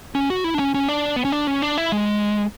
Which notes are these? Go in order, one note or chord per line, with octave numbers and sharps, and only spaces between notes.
C#4
F#4
E4
D4
C#4
C#4
D4
B3
C#4
D4
C#4
D4
E4
G#3